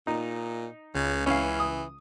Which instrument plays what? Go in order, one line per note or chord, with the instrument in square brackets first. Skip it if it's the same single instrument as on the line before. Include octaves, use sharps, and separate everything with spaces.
[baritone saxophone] A#2 [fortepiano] D#4
[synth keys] C#2 [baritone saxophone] C#3
[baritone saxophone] E3 [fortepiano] C#4 F5
[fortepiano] D#6